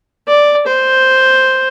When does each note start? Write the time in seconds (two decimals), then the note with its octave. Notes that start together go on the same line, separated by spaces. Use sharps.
0.28 D5
0.67 C5